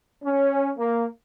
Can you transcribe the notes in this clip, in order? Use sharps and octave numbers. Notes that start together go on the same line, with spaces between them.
C#4
A#3